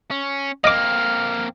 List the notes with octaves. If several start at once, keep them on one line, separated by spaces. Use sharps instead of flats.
C#4
A#3 C4 D#5 D6 F6